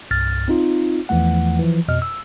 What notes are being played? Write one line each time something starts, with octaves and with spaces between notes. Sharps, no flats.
C2 G2 F6 A6
C4 D#4 F4
E2 E3 F3 A3 F#5
E3 F3
F2 B2 D#5 F6
E6